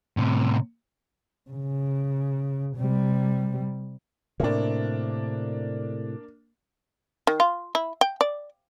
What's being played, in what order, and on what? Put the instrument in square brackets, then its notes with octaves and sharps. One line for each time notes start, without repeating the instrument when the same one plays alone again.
[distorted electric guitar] A2 C3
[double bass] C#3
C3 G3
[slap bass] A2 C3 [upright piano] A#3 D4
[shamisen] D#3
F4
E4
G5
D5